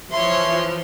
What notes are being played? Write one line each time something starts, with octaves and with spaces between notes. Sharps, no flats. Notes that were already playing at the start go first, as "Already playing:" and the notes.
E3 F3 C#5 E5 C6